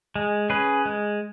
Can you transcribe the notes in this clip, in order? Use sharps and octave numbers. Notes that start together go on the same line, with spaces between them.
G#3
C#4 G#4 B4
G#3